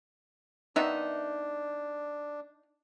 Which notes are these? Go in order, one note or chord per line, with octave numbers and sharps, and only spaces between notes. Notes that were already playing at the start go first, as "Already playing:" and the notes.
D#3 B3 D4 D#4 E5